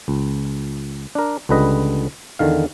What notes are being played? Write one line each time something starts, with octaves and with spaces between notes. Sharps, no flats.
C#2
D4 A#4
C#2 D3 G3 B4 D#5
E2 D3 D#3 F5